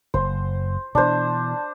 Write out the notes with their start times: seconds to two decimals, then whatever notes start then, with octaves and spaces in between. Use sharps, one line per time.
0.14 F#1 C5
0.95 B2 E3 D4 C5